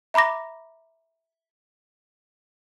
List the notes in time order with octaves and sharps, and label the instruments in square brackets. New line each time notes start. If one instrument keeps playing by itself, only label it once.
[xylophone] E5 A#5 B5 D6 A#6